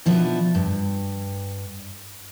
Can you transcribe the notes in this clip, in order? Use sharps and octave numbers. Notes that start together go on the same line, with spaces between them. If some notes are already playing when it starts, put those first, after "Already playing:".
B2 F3 B3 D4 E4
G2